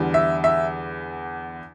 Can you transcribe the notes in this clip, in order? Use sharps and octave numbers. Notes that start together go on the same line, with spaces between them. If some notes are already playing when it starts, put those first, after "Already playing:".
Already playing: E2 D3 G3
E5
E5